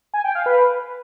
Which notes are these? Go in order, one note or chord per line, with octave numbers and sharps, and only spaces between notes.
G#5
G5
F5
B4